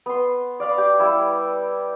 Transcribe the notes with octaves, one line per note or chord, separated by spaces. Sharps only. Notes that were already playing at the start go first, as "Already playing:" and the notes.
B3 C6
D5 F5 B5 D6
G4
G3 E4